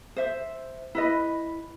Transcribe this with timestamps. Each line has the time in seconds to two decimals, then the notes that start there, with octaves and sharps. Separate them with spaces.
0.16 C5 E5
0.95 E4 B4 D#5